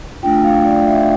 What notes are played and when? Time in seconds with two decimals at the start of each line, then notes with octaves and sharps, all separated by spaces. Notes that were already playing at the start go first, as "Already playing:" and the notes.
0.23 A3 D4 F4 G5
0.44 F5
0.65 D5
0.86 E5